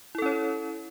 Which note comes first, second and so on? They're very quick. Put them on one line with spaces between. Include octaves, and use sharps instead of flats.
E4 A4 C#4 C#5